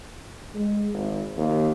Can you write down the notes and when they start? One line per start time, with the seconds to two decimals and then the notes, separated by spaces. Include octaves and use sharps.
0.54 G#3
0.93 G#1
1.37 D#2